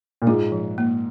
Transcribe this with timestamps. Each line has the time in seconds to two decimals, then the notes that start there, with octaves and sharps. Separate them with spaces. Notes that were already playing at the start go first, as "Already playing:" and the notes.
0.22 A#2
0.27 G#2 F4
0.52 F3
0.78 A#3